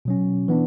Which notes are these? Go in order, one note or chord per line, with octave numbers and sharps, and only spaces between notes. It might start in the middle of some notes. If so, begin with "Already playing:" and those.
B2 F#3 C#4
E3 B3 D4